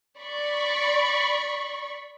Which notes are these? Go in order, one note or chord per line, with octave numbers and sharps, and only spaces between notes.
D5 B5 C#6